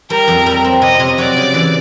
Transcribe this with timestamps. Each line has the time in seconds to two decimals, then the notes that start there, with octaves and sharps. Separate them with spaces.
0.10 G3 A#4
0.28 F2
0.46 G3
0.64 C4
0.82 C3 D#5
1.00 C3
1.18 F#3 D5
1.36 C#3
1.54 E3